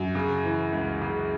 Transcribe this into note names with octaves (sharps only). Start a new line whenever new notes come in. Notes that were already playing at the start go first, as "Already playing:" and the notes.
Already playing: F#2 F#4
C#3
E3
C#2
C#3